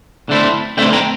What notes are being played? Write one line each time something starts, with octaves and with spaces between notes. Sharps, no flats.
D3 A3 C4 E4
D3 A3 C4 E4 E5 G5
G5 A#5